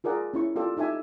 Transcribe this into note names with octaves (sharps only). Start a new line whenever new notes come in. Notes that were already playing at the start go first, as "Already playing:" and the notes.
F4 G#4 A#4 D5 F#5
C#4 E4 C#6
F4 G4 A4 D5
D#4 G4 A4 E5 G#5